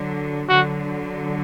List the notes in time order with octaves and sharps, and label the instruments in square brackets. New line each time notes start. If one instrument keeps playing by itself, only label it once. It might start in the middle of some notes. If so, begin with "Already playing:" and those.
Already playing: [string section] D3 F#3
[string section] D3 F#3 [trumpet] F#4